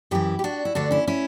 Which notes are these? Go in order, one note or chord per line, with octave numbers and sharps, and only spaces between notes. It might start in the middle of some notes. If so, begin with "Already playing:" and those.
F#2 E3 E4 G4
G4
D4 F#4
E4
D2 D3 D4 F#4
C#4 E4
C#4 E4